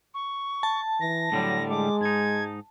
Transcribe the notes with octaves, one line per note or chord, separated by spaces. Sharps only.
C#6
A5
E3 A#6
A2 D3 F#3 G3
G#3 D6
G#2 D#4 G#6